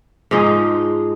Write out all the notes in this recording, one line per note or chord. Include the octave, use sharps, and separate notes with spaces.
G#2 F3 G#3 D#4